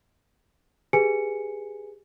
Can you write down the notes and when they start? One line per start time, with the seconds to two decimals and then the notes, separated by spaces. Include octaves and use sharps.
0.93 G4 G#4 B4 G#5 C#7 D7